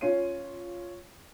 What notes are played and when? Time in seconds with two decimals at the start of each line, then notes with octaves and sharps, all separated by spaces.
0.01 C#4 F4 C#5 C7 D#7